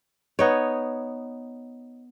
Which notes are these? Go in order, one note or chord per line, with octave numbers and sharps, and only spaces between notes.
B3 D#4 C#5